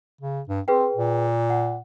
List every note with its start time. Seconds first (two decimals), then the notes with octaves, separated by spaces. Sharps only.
0.21 C#3
0.49 G2
0.68 C4 G#4 B4 G5
0.96 A#2
1.50 F#5